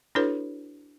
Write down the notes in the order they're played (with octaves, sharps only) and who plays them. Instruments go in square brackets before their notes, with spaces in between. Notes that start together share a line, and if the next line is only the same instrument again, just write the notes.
[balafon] D4 E4 F#4 A4 B4 C#5